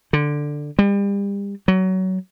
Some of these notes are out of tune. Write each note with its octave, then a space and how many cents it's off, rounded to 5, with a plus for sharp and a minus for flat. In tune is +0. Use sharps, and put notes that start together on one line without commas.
D3 +5
G3 +35
F#3 +20